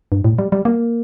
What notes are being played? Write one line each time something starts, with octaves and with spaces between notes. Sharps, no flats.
G2
A2
G3
G3
A#3